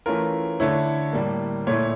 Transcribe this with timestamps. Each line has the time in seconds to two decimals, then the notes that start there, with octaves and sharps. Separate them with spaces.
0.06 E3 A3 C#4 F4 A#4
0.60 D3 A3 E4 C#5
1.13 A2 G3 A#3
1.67 A#2 A3 E4 C#5